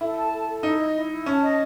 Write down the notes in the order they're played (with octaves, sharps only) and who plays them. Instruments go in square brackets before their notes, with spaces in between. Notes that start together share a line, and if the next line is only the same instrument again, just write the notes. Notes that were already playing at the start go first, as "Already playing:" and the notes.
[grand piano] E4 [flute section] A4
[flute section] A5
A4
A4
[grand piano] D#4 [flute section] E4
[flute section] D#5
E4
E4
[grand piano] C#4 [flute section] A5
[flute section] D#5